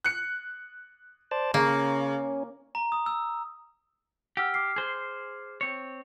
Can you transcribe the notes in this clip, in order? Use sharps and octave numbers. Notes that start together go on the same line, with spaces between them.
F#6 C#7
C5 D5 A5
C#3 A#3 C#4
A#5
D#6
E6
G4 F#5 E6 F6
D6 F6 C7
G#4 C5
C4 C#5